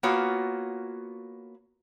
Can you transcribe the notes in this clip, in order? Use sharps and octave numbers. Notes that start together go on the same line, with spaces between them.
A#3 B3 F4 F#4 C#5